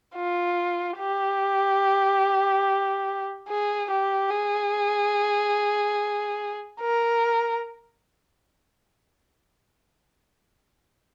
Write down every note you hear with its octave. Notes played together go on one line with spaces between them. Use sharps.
F4
G4
G#4
G4
G#4
A#4